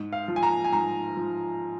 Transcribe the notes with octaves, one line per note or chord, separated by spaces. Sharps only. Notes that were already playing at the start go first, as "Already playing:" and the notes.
Already playing: G#2
F5
F3
G#5
A#5
G#5
G#2 A#5
F3